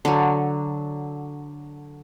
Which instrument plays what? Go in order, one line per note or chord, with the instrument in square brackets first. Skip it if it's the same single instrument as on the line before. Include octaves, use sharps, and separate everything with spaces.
[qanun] D3 F#3